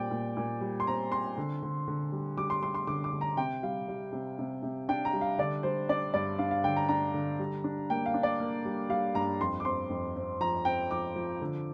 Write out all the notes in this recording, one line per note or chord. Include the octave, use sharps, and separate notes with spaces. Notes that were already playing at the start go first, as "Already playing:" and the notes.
Already playing: A#2 G3 C4 D5 G5
A#2
A#2
G3
C6
C4 A#5
C4 C6
D3
D3
D3
G3
G3 D6
C6
G3 C6
C6
D3 D6
D6
D3
A#5
C3 G5
G3 F5
G3
C3
C3
C3
D4 G5
A#5
G3
F5
D3 D5
G3 C5
D4 D5
G2 D5
D4 F5
F5
D3 G5
A#5
D4 A#5
D3
G3
D4
A#3 G5
F5
D4
D5
A#3
G3
G3 F5
G2 A#5
F2 C6
D6
C4 C6
F2
C4
F3 A#5
C4 G5
F3 D6
F3
D3